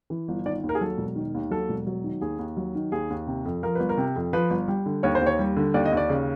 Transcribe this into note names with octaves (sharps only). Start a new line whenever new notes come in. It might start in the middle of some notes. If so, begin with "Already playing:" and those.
E3
G1
D#3 D5
D#2
A#4
G#4
F#3 A4
E1
D#3
D#2
F#3 A4
E1
F#3
D#3
D#2 G#4
D#2
F#3
D#3
D#2 G#4
D#2
C3
F2
F3 A#4
G1 B4
A#4
C3
F2
F3 B4
G1
G3
D3
D#2 C#5
C5
D#2
C#5
G3
D3
D#2 D5
D#5
D#2
D5
C#3